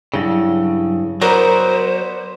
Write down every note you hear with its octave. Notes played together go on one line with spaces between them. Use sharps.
G2 C#3 F#3 E4
F#3 B3 A#4 C5 D5 C6